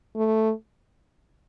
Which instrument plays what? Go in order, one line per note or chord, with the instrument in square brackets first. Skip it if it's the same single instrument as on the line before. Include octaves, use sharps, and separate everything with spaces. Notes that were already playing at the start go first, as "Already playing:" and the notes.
[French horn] A3